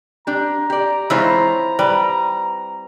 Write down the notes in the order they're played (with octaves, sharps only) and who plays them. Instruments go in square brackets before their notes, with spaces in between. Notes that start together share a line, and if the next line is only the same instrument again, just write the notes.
[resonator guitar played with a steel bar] D4 G4 [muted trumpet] A#5
[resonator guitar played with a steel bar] G4 D5
[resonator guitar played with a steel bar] E3 G#3 C#5 [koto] C4 E4 F4
[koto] G3 [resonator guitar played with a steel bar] B4 G5